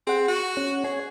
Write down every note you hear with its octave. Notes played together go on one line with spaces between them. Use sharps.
C4 G#4 F#5
F#4
C#4
G#4 C#5